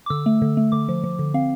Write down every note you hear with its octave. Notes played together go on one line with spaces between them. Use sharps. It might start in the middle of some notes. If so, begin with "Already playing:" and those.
D6
D3 E6
A3
D3
A3
D3 D6
F3
F3
D3
C4 F5